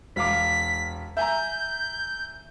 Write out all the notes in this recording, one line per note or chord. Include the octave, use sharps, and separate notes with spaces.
E1 F5 D6 B6
E5 G#5 A#5 G6